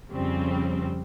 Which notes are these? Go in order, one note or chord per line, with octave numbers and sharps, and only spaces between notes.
F2 C#3 G3 C4